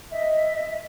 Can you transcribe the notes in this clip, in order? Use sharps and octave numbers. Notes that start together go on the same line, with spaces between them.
D#5 E5